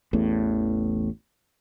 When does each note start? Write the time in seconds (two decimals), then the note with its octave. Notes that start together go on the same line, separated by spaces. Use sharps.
0.13 A1 E2 A2